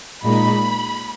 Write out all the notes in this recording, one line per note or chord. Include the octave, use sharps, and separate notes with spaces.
A#2 G#3 D#4 B5